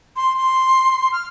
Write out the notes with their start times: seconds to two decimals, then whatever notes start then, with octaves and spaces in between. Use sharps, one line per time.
0.16 C6
0.37 C6
1.12 F6